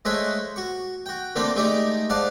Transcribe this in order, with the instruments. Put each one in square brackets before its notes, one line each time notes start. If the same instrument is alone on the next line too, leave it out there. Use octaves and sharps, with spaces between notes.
[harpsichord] G#3 A3 C5 C#5 E5 F#5
F#4 C#6
F#4 G5
D3 A3 A#3 C4 D5 D6
G#3 A3 D#4 G4 D5
G#2 D5 F5 F#5 A5